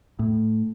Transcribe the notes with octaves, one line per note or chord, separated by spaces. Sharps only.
A2